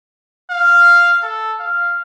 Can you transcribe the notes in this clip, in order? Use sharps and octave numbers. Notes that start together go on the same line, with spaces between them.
F5
A4
F5